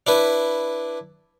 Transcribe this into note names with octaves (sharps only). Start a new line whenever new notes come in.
D4 E4 B4